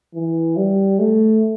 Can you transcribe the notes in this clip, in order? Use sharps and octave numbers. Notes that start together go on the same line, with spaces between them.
E3
G3
A3